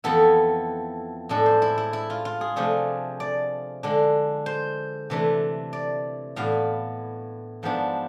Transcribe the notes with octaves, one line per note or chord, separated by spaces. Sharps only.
F2 E3 B3 E4 A4
A2 G#3 D4 A4
C5
E4
E4
E4
F4
F4
G#4
C3 F3 A3 D4 G#4
D5
D3 G#3 D4
C5
C3 E3 A3 D4
D5
A2 E3 B3 D4 F5
G#2 F3 B3 D4